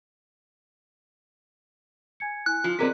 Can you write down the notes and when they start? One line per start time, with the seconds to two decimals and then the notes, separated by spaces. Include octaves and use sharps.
2.20 G#5 G#6 C#7
2.46 E4 G#5 F#6
2.64 F3 F4
2.79 C3 G#3 C4 G#4 A#4 B4 D5 B6